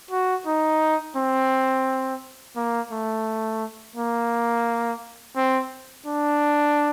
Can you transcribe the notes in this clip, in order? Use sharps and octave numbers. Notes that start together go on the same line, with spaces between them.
F#4
D#4
C4
A#3
A3
A#3
C4
D4